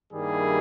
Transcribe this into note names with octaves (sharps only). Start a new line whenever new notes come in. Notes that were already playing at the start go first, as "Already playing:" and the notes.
G2 D#3 G3 A#3 E4 G#4